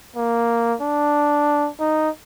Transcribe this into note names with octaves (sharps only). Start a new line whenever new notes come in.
A#3
D4
D#4